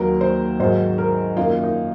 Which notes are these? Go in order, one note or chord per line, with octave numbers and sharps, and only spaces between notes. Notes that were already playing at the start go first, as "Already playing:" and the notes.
Already playing: D#2 D#3 F#3 A#3 A#4
C5
G#2 D#3 F#3 C5
A#4
F#2 D#3 A#3 F4
D#4